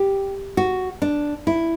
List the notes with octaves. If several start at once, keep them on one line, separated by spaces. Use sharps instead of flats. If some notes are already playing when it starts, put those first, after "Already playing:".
Already playing: G4
F#4
D4
E4